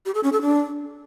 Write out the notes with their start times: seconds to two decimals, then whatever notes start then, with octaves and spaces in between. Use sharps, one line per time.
0.06 G4
0.15 A4
0.24 C#4
0.33 A4
0.42 D4